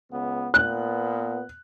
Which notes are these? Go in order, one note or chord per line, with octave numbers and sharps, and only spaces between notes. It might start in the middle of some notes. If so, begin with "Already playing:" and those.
C#2 B3
A#2 B3 F#6